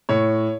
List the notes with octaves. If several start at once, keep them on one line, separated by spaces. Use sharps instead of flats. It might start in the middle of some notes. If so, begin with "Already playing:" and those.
A2 C#5